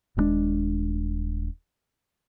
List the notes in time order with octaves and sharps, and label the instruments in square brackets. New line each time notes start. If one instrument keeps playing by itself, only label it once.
[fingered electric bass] D#1 G2 G#3 D4